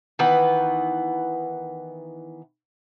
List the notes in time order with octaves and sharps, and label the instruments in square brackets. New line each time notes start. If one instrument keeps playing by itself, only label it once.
[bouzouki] D#3 E3 B3 B4